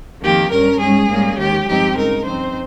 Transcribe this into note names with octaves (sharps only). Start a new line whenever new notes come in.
F2 D#3 A#3 G4
G2 G3 C#4 A#4
G#2 G3 C#4 G#4
G#2 G3 A#3 C#4
D#2 D#3 G#3 G4
G2 F3 G#3 C4 D#4 G4
C#3 G#3 D#4 A#4
G2 F3 C4 D#4 C5